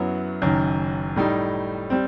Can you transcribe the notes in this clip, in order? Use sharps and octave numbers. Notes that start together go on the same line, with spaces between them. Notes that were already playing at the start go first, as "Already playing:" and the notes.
Already playing: F#2 F#3 B3 E4
F#1 F#2 D#3
A2 G3 D#4
G3 C4